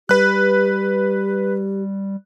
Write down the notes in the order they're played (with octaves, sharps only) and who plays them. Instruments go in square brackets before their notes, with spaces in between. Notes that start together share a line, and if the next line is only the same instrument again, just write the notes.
[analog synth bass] G3 [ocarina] G4 [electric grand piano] B4 F#6